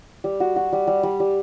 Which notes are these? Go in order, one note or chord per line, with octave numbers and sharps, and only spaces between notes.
G3
F#4
F#4
G3
G3
G3
G3